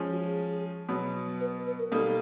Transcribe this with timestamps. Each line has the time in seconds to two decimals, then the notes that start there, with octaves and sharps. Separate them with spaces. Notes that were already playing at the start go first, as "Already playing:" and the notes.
Already playing: F3 G#3 C#4
0.11 F#4
0.24 G#4
0.89 B2 F#3 B3
1.40 B4
1.66 B4
1.79 A#4
1.92 B2 G3 A#3 D#4 A4